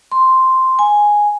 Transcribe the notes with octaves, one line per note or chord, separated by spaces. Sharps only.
C6
G#5